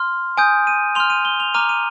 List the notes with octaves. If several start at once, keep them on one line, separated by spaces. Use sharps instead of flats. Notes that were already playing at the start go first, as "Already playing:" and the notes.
Already playing: C6 F6
G#5 D#6 G6 D7
D#7
C6 F6 F7
D#7
G7
F7
A#5 D6 F6 D#7
D#7